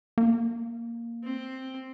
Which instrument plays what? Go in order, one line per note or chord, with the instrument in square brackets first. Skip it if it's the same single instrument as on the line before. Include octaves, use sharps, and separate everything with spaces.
[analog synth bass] A#3
[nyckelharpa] C4